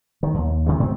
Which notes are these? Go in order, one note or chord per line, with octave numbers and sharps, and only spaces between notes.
D#3
D#2
C3 D#3 G#3
G#2 D#3 C4